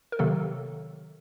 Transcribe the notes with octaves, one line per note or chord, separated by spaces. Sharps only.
A#4
C3 D#3 F#3 A#3 A4